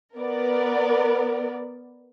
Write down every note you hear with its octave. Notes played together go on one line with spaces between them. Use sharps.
B3 A#4 D5